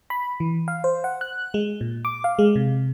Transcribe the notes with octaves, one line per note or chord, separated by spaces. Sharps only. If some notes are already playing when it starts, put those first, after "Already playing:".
B5
E3
F5
C5
F#5
F#6
G#3
A#2
D6
F5
G#3
C3